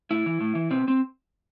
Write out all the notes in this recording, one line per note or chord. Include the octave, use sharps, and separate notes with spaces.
A2 E4
E3
A2
E3
B2 C4
C4